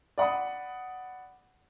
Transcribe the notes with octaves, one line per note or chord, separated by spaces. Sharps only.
D5 F#5 B5 D#6